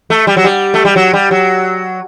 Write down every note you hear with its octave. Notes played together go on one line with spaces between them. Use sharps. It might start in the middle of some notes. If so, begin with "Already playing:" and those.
A3
G3
F#3
G3
A3
G3
F#3
G3
F#3